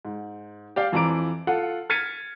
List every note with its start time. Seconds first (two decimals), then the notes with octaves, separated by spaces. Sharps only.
0.05 G#2
0.76 G4 D5 F5 G5
0.92 F2 E3 F3 A#5 D6 D7
1.47 F4 A4 F#5
1.90 F6 G#6 A6 B6 C#7 D#7